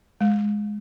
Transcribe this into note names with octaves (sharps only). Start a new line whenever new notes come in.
G#3